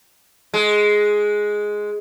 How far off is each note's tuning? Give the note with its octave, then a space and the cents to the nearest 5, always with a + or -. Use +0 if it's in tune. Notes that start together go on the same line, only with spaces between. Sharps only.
G#3 +5